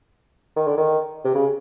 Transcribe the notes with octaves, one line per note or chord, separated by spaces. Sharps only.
D#3
D3
D#3
C3
C#3